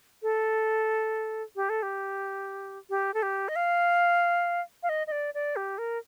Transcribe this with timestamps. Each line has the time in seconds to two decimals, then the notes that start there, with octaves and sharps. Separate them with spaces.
0.23 A4
1.56 G4
1.69 A4
1.83 G4
2.90 G4
3.14 A4
3.23 G4
3.49 D#5
3.56 F5
4.83 F5
4.89 D#5
5.07 D#5
5.12 D5
5.34 D5
5.56 G4
5.78 A#4